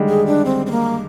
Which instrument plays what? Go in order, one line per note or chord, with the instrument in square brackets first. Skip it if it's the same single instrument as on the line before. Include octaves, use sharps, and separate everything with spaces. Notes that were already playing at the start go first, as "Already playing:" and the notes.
Already playing: [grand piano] D3 D#3 G3 G#3
[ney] G#4
D4
C4
C4
A#3